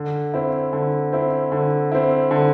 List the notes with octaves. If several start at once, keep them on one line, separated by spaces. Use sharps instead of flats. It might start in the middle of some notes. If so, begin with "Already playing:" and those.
Already playing: D3
C4 E4
D3
C4 E4
D3
C4 E4
D3